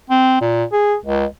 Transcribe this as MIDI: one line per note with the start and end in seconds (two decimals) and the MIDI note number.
0.10 0.38 60
0.41 0.64 46
0.72 0.95 68
1.06 1.25 37